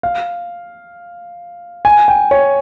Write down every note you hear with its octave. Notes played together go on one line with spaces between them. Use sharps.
F5
G#5
G5
C#5